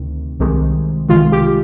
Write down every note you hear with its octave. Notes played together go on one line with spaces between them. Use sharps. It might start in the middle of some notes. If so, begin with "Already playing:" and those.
Already playing: D2 C3 D#3
C2 C3 D#3 G#3
C2 C3 D#3 G#3 F4
G4